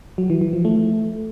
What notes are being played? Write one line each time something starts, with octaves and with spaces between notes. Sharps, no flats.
F#3
E3
E3
F3
A3